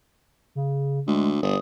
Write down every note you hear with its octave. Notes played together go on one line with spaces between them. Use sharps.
C#3
D2 G#3
G1 D#6